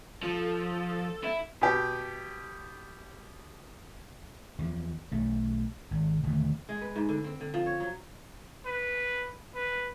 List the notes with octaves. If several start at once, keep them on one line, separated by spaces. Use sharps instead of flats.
F3 A4
E4
B2 G4
E2 F3
B1 A3
G#1
E1 D#2 D3 A3
G#3
B4
G#2
D3
C4
D3
F3
C#5
F#3
B4
B4